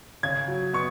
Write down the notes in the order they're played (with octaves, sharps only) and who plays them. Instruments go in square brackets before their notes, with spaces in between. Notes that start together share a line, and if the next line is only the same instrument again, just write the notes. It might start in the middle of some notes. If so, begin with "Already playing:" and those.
[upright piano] C#3 G#6
F#3
B3 C#6